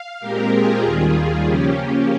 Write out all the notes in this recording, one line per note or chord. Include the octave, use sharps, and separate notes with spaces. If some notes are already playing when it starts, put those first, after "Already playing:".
Already playing: F5
A#2 G#3 C4 G4 A#4
F4 G#4
D#2 D#3 G3
C#3 F3 A#3 C#4 G4
G4